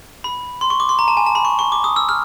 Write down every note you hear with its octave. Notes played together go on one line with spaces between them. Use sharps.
B5
C6
C#6
D6
C6
A#5
A5
G#5
A5
B5
C#6
C#6
D6
D#6
E6
F6